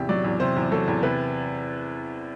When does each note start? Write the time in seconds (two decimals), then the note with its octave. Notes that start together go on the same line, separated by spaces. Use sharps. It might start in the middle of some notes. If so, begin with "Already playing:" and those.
Already playing: E2 C3 G4
0.09 F#3 D5
0.24 E2
0.40 C3 C5
0.57 E2
0.71 F#3 A4
0.88 E2
1.03 C3 B4